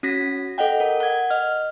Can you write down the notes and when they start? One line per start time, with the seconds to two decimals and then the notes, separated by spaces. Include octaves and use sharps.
0.03 C#4 F#4 A#6 B6
0.58 A4 D#5 F#5 G5
0.80 A#4
1.00 F#5 G#6
1.30 D#5 F6